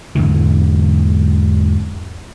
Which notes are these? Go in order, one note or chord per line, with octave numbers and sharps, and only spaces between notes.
E2 G#2 D3 E3